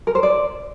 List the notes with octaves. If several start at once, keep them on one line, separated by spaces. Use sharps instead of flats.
A#4
C5
D5